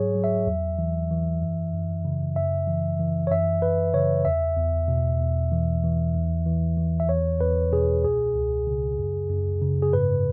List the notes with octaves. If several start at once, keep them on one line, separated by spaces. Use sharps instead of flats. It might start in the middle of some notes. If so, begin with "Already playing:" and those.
Already playing: G#2 F#3 G#4 C#5
F#3
E5
E2
E3
E3
F#2
F#2
C#3
F#2 E5
E3
E3
C#5
F#2 E5
F#2 B4
C#3 C#5
E2 E5
E2
B2
E2
E3
E3
E2
E3
E3
E5
E2 C#5
E2 B4
B2 G#4
C#2 G#4
C#2
C#3
F#2
F#2
C#3
G#4
G#2 B4